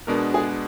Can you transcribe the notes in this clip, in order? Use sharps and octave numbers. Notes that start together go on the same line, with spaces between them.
B2 G#3 B3 D4 A#4
G#4